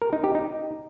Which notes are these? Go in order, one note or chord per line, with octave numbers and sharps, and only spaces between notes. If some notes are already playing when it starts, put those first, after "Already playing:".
A#4
D#4
G4
D#4